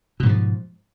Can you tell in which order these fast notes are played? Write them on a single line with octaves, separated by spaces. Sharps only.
B2 G#2 E3 F3